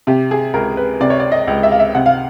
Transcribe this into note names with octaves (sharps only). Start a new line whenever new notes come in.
C3 G4
G#4
C#2 A#4
B4
C3 D5
C#5
D5
D#5
C#2
E5
F5
E5
C3 F#5
F5